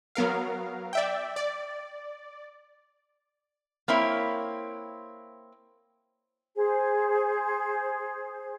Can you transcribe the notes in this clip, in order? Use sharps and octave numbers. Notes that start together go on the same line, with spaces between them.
F#3 B3 A#4 F5
D5 E5 G5
D5
A#3 C4 E4 C#5
G#4 C5